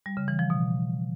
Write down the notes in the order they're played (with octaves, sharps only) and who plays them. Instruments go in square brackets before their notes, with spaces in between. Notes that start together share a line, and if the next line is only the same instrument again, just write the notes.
[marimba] G3
C#3
E3
F3
B2